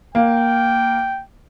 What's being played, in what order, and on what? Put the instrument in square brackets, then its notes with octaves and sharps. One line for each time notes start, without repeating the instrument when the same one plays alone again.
[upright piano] A#3 [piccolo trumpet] G5